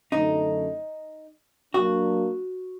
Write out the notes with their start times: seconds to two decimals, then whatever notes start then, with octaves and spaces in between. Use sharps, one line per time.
0.12 F#2 D3 A3 D#4
1.74 F#3 A#3 D4 F#4